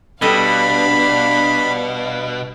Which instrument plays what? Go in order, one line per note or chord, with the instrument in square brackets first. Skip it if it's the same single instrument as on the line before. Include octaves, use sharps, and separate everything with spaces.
[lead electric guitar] B2 [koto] G3 A4 D#5 [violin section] D4 F5 [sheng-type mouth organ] B5